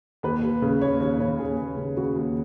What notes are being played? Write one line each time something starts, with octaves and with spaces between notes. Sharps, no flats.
D#2 B4
D#2
C#3
D#2 C#5
D#2 C#5
C#3 C#5
D#2 G#4
D#2
C#3
C#3 F#4
D#2